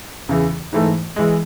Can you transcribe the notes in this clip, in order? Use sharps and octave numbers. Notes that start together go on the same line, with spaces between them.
E2 C#3 E3
G#2 E3 A3
E3 G#3